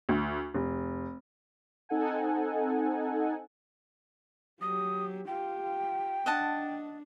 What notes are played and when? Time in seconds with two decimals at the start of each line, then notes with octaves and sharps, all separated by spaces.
0.09 D2
0.54 F1
1.89 C4 D#4 A4 F#5 G#5
4.61 F#3 G4 D#6
5.27 F4 G4 G5
6.26 D4 D#5 F#5 A5